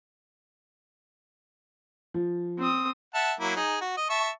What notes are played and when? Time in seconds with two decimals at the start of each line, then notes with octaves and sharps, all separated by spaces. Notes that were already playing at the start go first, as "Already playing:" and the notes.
2.14 F3
2.58 C4 D#6
3.14 E5 F#5 A5
3.40 F#3 A#3 E4
3.56 D#4 G#4
3.81 F#4
3.97 D#5
4.10 E5 A5 C#6